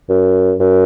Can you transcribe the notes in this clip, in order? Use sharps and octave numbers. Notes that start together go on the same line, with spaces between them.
F#2
F#2